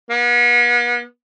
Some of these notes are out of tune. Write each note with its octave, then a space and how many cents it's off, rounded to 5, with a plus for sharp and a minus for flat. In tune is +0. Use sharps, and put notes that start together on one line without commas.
B3 -45